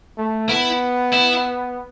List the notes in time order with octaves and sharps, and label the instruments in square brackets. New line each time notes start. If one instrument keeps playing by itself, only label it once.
[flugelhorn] A3
[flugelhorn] B3 [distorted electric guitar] E4
[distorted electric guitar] E4